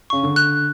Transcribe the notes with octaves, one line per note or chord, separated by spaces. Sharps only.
C#3 C#6
D3
F#6